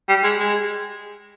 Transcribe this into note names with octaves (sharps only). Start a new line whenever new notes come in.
G3
G#3
G#3